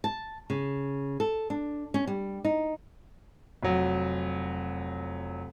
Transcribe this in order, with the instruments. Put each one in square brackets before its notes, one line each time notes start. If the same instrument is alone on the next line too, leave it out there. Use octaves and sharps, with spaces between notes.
[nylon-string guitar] A5
C#3
A4
D4
C#4
G3
D#4
[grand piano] F1 F#3